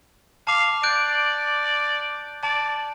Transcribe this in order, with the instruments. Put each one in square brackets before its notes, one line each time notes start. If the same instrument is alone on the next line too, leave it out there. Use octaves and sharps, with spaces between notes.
[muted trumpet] F5 [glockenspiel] A5 D6
[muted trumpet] D5 [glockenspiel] F#6 G6 D7
[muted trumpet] D5 [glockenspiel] A5